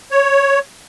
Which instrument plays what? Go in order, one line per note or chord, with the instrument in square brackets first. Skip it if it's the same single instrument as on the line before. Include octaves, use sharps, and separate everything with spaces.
[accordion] C#5